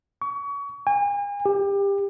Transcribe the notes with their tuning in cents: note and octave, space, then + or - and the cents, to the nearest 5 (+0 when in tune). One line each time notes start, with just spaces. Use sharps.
C#6 +30
G#5 -40
G4 +25